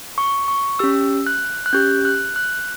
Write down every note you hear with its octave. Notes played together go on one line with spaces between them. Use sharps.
C#6
C#6
C#4 G4 E6
F#6
F#6
C#4 G4 G6
F#6
F#6